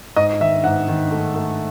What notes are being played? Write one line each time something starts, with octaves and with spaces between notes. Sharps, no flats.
G#2 D#5
D#3 E5
G#2 F#5
D#3
A3
A3